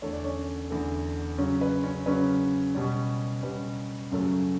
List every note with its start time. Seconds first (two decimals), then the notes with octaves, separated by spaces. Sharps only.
0.02 E2 D3 A3 C#5
0.13 D5
0.24 C#4 C#5
0.70 E2 D3 A3
1.38 C#3 F#3 C#4
1.61 B4
1.84 C#4 C#5
2.06 C#3 F#3 C#4 B4
2.75 B2 G3 C#4
3.43 B2 G3 C#4 B4
4.11 F#2 C#3 F#3 A3 C#4